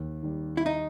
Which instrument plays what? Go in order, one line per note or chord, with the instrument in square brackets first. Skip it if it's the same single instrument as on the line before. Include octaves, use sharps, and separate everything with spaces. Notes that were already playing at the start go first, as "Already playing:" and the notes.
Already playing: [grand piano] D#2
D#3 G3
[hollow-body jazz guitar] E4
D#4